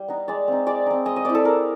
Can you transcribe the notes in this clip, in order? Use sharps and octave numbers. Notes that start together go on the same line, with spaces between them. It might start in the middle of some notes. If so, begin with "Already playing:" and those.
Already playing: G3
B3 D#4
G#3 D5
C4 D#4
G#3 D5
C4 D#4
G#3 D#5
D#5
C4 E4 D5
A4
G#3 A#4